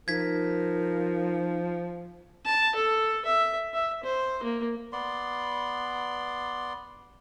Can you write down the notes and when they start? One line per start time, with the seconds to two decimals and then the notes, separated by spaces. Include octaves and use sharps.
0.08 F3 D#4 A#4 G#6 B6
2.45 A5
2.75 A4
3.25 E5
3.74 E5
4.03 C5
4.43 A#3
4.93 B3 D5 C6